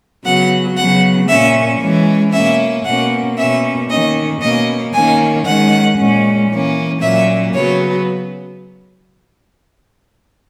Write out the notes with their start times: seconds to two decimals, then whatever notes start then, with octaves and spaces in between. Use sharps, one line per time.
0.24 C#3 F#3 B3 F#5
0.76 C#3 F#3 B3 F#5
1.28 A#2 A#3 C#4 E5
1.81 E3 G#3 C#4
2.33 B2 A#3 C#4 E5
2.85 B2 A#3 C#4 F#5
3.37 B2 A#3 C#4 E5
3.90 D#3 A#3 C#4 D#5
4.41 B2 A#3 C#4 D#5
4.94 D#3 A#3 C#4 G#5
5.45 D#3 G#3 C#4 F#5
5.99 A#2 G#3 C#4
6.50 E3 A#3 C#4
7.02 A#2 F#3 A#3 C#4 E5
7.54 C#3 F#3 B3 C#5